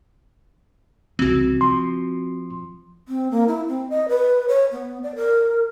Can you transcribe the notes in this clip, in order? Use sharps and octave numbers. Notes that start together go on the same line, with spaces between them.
C2 C#3 E3 C4 F#4
F3 C6
C4
A#3
E4
C4
D#5
B4
C#5
B3
D5
A#4